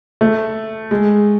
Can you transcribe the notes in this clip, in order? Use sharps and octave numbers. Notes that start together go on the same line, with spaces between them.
A3
G#3